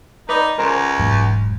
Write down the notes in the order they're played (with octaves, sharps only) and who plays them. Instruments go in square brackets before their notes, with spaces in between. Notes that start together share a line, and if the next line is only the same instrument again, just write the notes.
[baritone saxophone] D#4 [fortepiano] B4 D5 D#5
[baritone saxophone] C#2 [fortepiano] A#4 C5 A#5
[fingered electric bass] E1 G#2 F#3